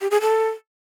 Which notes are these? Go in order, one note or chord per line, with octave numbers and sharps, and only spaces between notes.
G4
G#4
A4